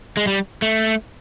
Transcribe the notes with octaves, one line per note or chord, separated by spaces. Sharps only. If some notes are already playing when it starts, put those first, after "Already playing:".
G#3
G3
A3